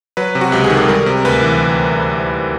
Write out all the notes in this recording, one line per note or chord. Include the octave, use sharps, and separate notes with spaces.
F#3 B4
C3
F#4
C#2 G4
G#4
D#3
A4
G3 A#4
C3
D2 B4
E3